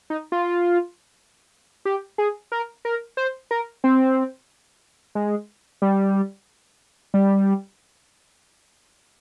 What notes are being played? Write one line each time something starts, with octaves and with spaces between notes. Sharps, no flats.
D#4
F4
G4
G#4
A#4
A#4
C5
A#4
C4
G#3
G3
G3